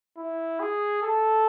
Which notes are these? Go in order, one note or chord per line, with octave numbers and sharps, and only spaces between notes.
E4
G#4
A4